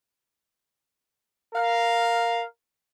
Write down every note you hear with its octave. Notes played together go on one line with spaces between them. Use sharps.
A#4 F5